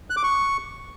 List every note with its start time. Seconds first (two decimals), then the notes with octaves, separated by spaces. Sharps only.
0.10 F#6
0.17 D6
0.23 C#6